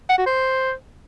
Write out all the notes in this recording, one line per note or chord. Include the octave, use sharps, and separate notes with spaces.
F#5
F#4
C5